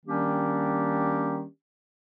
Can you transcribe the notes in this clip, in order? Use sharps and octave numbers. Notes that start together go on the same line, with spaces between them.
D#3 G3 A#3 C#4 D4 G4